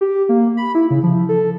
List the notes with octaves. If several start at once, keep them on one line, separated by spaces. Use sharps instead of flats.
G4
A#3
B5
E4
C#3
F3
A4